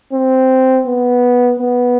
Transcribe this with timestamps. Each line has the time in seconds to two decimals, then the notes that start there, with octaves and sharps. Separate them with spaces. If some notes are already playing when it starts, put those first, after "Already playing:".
0.13 C4
0.86 B3
1.60 B3